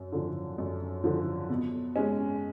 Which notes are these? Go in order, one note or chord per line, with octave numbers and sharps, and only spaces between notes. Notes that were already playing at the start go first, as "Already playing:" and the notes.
Already playing: F#2
D3 F3
F#2
D3 F3
B2
G#3 C#4